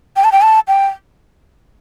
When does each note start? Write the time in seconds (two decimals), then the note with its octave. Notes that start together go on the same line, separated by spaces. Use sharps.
0.16 G5
0.24 A5
0.32 G5
0.42 A5
0.68 G5